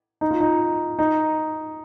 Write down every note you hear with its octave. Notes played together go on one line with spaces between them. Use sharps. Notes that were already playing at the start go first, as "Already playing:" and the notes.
D#4
F4
D#4
D#4